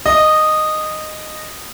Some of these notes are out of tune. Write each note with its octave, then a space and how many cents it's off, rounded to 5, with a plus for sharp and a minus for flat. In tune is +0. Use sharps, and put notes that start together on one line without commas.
D#5 -10